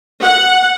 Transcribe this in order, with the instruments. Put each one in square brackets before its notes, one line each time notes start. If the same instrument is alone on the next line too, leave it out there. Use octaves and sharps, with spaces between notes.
[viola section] F#5